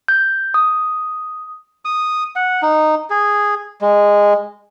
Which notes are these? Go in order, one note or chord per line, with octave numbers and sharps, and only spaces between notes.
G6
D#6
D#6
F#5
D#4
G#4
G#3